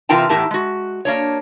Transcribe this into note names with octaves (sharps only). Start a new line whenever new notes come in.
C3 E3 F4 A#4 G5 A5
E2 A2 E4 G4 A#4 A5
G#3 F#4
A#3 D4 C#5